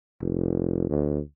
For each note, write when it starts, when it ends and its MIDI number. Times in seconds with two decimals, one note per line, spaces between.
0.21 0.85 29
0.89 1.20 38